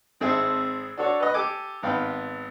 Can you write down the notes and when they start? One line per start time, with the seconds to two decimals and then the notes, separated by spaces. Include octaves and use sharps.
0.20 G#1 C4 G#4 A4 E5
0.97 D4 F#4 A4 C#5
1.20 B4 D#5
1.34 G4 A4 G#5 D6
1.83 G#1 B3 F5 G5 B5